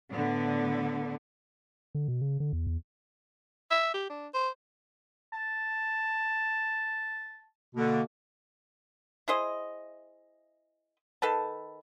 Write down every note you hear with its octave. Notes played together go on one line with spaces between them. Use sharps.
A2 D3 B3
D3
B2
C#3
D3
E2
E2
E5
G4
D4
C5
A5
B2 D3 A#3
E4 G#4 C5 D#5
D#3 A4 B4 A5